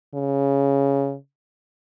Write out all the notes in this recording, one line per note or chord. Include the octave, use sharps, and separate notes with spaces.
C#3